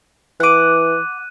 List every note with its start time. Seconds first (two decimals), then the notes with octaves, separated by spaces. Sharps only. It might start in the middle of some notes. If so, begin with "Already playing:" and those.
0.40 E3 F#5 D6 F#6 D#7